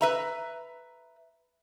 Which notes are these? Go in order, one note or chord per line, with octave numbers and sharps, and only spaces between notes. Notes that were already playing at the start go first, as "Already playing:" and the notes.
B4 E5 A#5